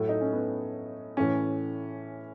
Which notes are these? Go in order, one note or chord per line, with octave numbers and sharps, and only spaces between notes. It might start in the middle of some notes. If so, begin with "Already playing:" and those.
Already playing: A2 F#3 A3
D#4
C#4
B3
A2 E3 C#4